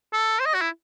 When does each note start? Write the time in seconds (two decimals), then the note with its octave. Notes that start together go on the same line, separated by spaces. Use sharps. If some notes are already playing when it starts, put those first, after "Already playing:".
0.13 A4
0.39 C5
0.45 D#5
0.54 F#4
0.61 E4